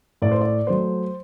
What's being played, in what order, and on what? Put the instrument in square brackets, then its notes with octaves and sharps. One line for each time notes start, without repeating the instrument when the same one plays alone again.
[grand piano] A2 D5
C5
D5
F#3 A3 C5